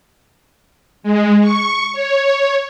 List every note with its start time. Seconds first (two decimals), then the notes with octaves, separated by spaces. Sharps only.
1.03 G#3
1.41 C#6
1.93 C#5